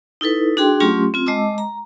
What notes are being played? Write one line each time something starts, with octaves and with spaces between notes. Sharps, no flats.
D#4 E4 A4 B4
D4 F#4 G#4 G5 C6
F#3 A3 C#4 F4 G4 C6
C4 F4
G#3 D#5 A5 D6 E6
A#5